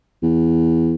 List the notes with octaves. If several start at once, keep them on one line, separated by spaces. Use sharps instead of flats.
E2